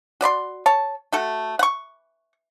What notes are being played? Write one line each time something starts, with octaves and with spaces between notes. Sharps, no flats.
F#4 D5 B5 C6
C#5 A5
A3 F#4 A4
F#5 C#6